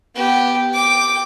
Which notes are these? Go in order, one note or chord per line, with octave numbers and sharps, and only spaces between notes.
B3 G4
G5 D6